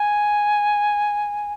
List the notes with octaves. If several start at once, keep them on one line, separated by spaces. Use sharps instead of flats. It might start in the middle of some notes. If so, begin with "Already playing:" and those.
Already playing: G#5